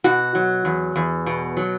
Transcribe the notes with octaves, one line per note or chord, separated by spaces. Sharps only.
B2 F#4
F#3
E2
E2
B2
F#3